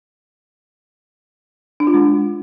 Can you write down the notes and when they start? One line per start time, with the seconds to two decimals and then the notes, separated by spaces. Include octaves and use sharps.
1.80 D4
1.87 F4
1.94 G#3